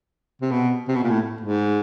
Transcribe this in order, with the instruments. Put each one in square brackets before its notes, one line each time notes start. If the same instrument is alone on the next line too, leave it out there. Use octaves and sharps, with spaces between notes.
[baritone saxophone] C3
B2
C3
B2
A#2
A2
G#2